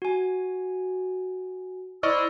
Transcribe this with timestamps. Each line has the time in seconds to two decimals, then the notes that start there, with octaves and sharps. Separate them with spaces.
0.02 F#4 G#5
2.03 E4 C5 D5 D#5 C#6 E6 F6